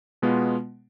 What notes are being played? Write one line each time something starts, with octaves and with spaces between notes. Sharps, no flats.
B2 G#3 B3 F4